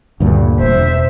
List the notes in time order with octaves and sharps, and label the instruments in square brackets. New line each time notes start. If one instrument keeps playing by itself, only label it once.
[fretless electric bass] D2 G2 A#2
[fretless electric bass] E1 [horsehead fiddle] C5 E5